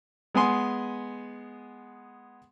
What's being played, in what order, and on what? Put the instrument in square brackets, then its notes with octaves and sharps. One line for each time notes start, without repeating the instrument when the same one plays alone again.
[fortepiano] G#3 B3 G#4 G#5 C6